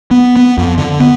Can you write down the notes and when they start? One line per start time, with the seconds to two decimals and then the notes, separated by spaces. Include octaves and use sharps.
0.11 B3
0.36 B3
0.58 F2
0.78 D3
1.00 B3